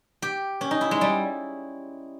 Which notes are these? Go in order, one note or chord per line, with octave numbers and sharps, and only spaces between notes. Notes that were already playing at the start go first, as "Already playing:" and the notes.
G4
C#4
D#4
E4
G#3
G3